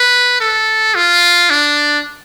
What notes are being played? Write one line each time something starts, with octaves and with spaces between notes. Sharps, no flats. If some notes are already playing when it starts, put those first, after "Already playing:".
Already playing: B4
A4
F4
D4